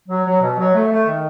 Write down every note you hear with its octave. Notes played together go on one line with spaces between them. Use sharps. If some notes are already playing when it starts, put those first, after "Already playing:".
F#3
F#3
B2
F#3
A3
A3
D#3